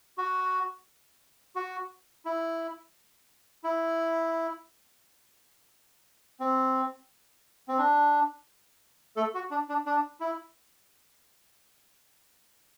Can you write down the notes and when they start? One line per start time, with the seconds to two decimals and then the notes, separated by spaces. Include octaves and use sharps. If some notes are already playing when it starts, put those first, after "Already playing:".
0.18 F#4
1.56 F#4
2.26 E4
3.64 E4
6.40 C4
7.68 C4
7.78 D4
9.16 A3 A4
9.34 F#4
9.51 D4
9.69 D4
9.86 D4
10.20 E4